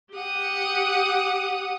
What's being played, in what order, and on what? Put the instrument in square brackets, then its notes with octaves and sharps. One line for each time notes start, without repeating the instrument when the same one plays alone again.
[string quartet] G4 F#5 D#6